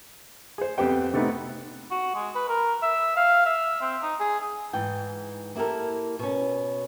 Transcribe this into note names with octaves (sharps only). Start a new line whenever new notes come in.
G#4 C5
F2 B3 G4 C5 G5
C3 A3 B3 D#4 G4 B4
F#4
G#3
B4
A#4
E5
F5
E5
C4
D#4
G#4
G#2 E3 G5
A#3 E4 G4 A4 A#4
B2 C#4